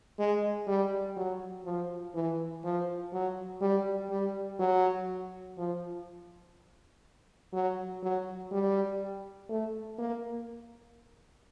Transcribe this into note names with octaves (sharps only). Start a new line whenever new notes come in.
G#3
G3
F#3
F3
E3
F3
F#3
G3
G3
F#3
F3
F#3
F#3
G3
A3
A#3